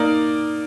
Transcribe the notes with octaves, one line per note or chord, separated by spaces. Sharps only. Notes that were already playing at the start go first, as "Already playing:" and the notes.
Already playing: A#3 D#4 A#4 D5